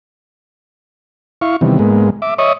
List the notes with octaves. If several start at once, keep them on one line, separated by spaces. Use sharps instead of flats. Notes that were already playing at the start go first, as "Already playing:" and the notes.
E4 F5 C#6
C3 D#3 E3 G3 B3
G#2 G#3 A#3 B3
E5 D6
C#5 D#5 E5 C#6 D#6